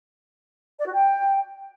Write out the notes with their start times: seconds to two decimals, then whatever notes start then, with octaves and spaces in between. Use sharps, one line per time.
0.79 D5
0.86 F#4
0.93 G5